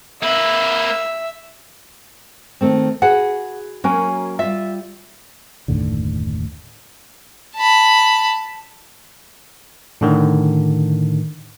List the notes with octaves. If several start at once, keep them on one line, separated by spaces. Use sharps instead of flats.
A#3 B4 E5
D#3 A3 C4
F#4 G#4 B4 F#5
F#3 A#3 C#4 F#4 A#4 G#5
G3 F4 E5
F#1 D#2 A2 D3
A5 B5
A2 D3 D#3